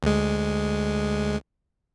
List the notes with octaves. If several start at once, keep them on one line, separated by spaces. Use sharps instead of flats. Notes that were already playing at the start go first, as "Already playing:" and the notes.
D2 G#3